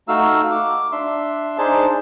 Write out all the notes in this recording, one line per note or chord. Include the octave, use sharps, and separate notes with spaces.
A3 D#4 F#4 F5 E6
D6
D4 E5 C6
D4 D#4 G#4 C5 A5